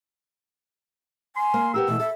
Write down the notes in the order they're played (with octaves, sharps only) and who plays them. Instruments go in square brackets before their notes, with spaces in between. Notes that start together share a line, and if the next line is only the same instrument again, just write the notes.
[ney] G#5 [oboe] C6
[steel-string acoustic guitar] A#3
[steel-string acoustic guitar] B3 G4 A#4 [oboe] E6
[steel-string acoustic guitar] B2 E3 [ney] A3
[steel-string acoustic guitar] A4 [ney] E5